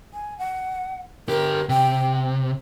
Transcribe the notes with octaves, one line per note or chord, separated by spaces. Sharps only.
G#5
F#5
D3 G4 A#4
C3 G5